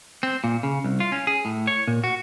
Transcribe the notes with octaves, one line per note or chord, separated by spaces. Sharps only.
C4
A#2
C#3
C2
F4
C#4
G#4
A2
C#5
A#2
F#4